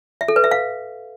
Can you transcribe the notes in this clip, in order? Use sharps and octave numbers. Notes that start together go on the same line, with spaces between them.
E5
A4
B4
E5
F5